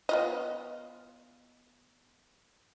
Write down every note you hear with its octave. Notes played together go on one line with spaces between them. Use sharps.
B3 F4 D#5